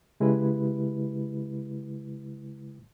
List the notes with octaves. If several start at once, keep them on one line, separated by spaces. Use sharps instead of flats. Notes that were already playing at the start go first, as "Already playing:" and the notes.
C#3 G#3 E4 G4 B4